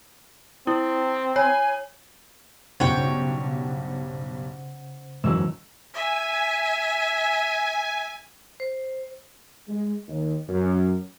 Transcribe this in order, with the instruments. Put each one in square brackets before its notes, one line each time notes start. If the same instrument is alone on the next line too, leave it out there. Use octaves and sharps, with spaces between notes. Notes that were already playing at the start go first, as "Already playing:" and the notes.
[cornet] C4 [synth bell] E4
[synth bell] C#5 [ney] G#5
[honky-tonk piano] B1 G2 [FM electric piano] C#3 C5 F#5 [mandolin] C#5 G5
[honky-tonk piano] F#1 E6 [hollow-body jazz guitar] G#2 E3 F#3
[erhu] E5 [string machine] G#5
[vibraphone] C5
[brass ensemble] G#3
D#2
F#2